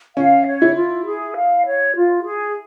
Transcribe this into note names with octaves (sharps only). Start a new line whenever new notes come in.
C#4 F5
C#5
E4
F4
G#4
F5
C#5
F4
G#4